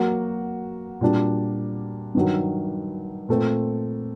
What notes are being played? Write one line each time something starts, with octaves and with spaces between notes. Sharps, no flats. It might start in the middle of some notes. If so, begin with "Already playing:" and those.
Already playing: F#3 A#3 F#4
A#2 G3 D4 F#4
G2 D#3 F#3
A#2 A3 C4